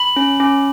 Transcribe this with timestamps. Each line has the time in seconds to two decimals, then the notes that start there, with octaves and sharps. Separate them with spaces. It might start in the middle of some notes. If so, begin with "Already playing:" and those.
Already playing: B5
0.16 C#4
0.40 C#4